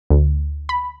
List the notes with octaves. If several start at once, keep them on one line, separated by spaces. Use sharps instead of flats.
D2
B5